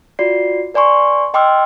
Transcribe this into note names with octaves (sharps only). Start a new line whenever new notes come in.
F4 F#4 D5 C7
B4 D5 G#5 C6 C#6
D#5 G5 C6 D6 E6 F6